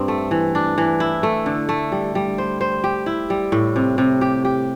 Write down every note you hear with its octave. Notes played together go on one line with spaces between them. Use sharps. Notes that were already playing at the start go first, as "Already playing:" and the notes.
Already playing: G2 C4
A3
E3
D4
E3
E4
A3
D3
A3
G3
G3
C5
C5
G4
E4
G3
A2
C3
C3
G4
G4